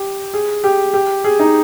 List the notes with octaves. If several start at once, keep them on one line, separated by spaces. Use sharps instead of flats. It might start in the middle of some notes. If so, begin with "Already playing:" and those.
Already playing: G4
G#4
G4
G4
G#4
D#4